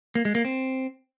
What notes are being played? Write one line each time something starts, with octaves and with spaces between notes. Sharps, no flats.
A#3
G#3
A#3
C4